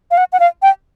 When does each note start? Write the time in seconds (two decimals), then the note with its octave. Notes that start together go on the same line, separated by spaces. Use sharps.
0.11 F5
0.17 F#5
0.33 F#5
0.40 F5
0.62 G5